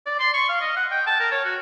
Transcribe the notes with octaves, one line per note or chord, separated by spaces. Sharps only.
D5
C6
C#6
F5
D#5
F#5
G5
A5
A#4
C#5
F#4